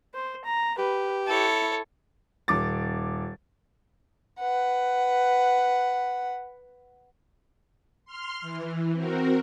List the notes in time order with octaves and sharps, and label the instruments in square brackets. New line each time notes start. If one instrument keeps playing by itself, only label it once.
[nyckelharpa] C5
A#5
[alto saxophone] G4 [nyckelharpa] B4
[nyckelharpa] E4 [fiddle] A4 C#5
[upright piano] D#1 D6 A6
[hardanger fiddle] B4 F#5
[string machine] C6 F6
E3
C4 F#4 A#4